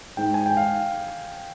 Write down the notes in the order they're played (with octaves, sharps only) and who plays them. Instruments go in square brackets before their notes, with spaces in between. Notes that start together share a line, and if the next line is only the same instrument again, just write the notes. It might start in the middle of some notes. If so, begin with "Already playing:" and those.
[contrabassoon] G#2 [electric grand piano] G5
[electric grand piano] G#5
G5
F5